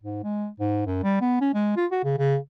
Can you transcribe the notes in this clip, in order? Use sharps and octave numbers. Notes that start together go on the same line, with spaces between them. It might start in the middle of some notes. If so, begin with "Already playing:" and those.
G#2
G#3
G#2
F#2
G3
B3
C#4
G#3
F4
F#4
C#3
C#3